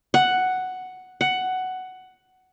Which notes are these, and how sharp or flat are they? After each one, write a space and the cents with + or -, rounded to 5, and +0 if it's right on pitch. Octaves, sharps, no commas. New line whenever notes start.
F#5 +5
F#5 +10